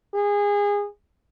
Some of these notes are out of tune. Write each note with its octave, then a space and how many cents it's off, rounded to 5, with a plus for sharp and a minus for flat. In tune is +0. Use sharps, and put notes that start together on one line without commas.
G#4 -25